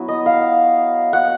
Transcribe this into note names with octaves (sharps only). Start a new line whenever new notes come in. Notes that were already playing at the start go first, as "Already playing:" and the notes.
Already playing: F#3 B3 E4
D#5
F5
F#5